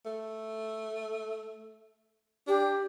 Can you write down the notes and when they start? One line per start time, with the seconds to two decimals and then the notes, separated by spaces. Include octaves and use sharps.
0.06 A3
2.47 D4 G4